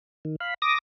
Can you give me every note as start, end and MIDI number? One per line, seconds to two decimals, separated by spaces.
0.25 0.36 51
0.41 0.54 77
0.41 0.54 83
0.62 0.78 86
0.62 0.78 87
0.62 0.78 94